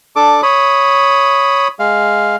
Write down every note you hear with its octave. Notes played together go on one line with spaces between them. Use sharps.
D4 A4 D6
C#5 B5 D#6
G#3 F5